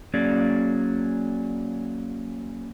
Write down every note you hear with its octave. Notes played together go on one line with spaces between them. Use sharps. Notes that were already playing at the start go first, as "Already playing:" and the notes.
F#3 A#3 C#4 G#4 D5